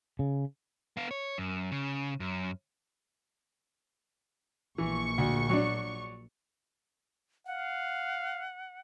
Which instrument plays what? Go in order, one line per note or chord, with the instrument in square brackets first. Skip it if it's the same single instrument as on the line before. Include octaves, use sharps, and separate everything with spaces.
[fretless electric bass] C#3
[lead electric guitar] B3 F5
C#5
F#2
C#3
F#2
[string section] A#1 C#6 [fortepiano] E3
[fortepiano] D2
F#3 D4
[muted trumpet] F5 [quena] F#5